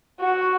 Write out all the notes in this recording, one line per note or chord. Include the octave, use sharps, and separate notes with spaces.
F#4